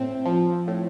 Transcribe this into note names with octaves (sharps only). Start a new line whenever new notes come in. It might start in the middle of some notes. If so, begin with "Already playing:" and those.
Already playing: A2 C4
F3
A2